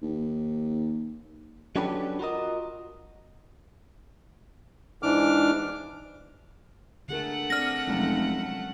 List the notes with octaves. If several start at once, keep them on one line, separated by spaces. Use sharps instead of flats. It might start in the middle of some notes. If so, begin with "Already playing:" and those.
D#2
F#3 C#4 D4 G4 A4 B4
F4 F#4 A#4 D#5
G#2 E3 D4 D6 F6
D3 A3 G#4 A#4 F#5
C4 D5 F6 A#6
F1 F#3 G#3 C#4